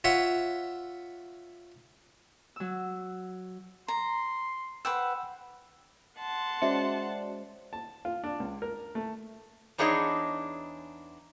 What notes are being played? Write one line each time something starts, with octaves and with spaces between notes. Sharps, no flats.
F4 C#5 E5 F#5
F#3 E6
A#5 C6
B4 C5 F#5 G5 E6
F#5 A5 C6
G#3 C#4 F#4 C5 D5 E5 C#7
A5
F4
D4
C#2
A#4
A3
E2 D4 D#4 G#4 C#5 D#5